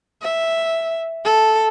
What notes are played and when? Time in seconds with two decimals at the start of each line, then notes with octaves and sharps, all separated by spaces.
0.22 E5
1.25 A4